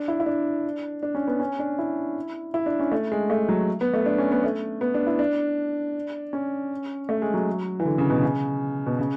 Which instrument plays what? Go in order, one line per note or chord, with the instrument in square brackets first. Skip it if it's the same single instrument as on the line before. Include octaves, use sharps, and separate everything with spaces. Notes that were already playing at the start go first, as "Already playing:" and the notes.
Already playing: [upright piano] D4
E4
E4
D4
D4
C#4
B3
C#4
D4
E4
E4
D4
C#4
A3
G#3
A3
F#3
B3
A3
D4
C#4
B3
A3
B3
D4
E4
D4
C#4
A3
G#3
F#3
E3
D3
C#3
B2
C#3
B2
C#3